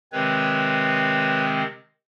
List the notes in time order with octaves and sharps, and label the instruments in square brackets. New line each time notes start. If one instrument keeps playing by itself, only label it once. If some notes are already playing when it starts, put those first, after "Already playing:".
[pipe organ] C3 D#3 G#3 C4 B4 C#5